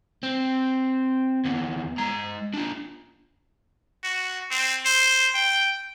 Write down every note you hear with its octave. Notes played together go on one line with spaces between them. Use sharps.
C4
D#2 B3
G#3 A#5
D4 F4
F#4
C4
C5
G5